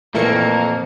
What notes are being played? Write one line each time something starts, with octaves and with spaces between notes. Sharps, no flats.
F2 A#2 E3 A3 A#3 A#4 C#7